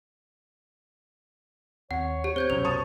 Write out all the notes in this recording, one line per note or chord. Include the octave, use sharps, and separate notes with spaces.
D#2 C4 C#5 F#5
G4
C4 C5 G6 G#6
C2 F#2 B2 F7
A5 C#6 D#6